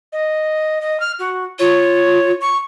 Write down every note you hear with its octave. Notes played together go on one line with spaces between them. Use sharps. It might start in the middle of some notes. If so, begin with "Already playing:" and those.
D#5
D#5
F6
F#4
F4 C#5
C#6